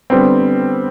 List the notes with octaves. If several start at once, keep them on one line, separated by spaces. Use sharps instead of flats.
D3 G3 B3 C4